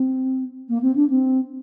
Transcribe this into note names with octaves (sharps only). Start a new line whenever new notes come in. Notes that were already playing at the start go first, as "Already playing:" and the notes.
Already playing: C4
A#3
C4
D4
C4